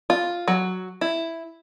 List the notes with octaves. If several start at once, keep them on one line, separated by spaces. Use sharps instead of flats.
F4
F#3
E4